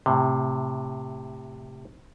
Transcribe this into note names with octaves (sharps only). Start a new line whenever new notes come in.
A2 C3